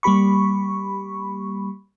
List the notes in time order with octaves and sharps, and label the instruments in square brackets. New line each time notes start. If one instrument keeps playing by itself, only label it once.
[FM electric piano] G3 A#3 G4 B5 C#6